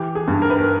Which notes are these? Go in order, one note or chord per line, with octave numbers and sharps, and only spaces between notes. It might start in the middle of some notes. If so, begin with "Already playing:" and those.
Already playing: E3 G4
G#4
G2
A#4
B4
A#4